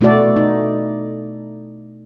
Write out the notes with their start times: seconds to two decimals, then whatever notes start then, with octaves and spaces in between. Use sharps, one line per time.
0.01 B2 A3 E4 F#4 A4 D5
0.36 D#4